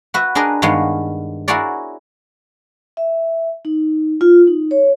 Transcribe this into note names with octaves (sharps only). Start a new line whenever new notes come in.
F#4 B4 E5
D4 G#4 A#4 B4 D#5
G2 D#3 G#3 B3 C#5 F5
E4 F#4 G#4 A#4 C#5 D5
E5
D#4
F4
D#4
C#5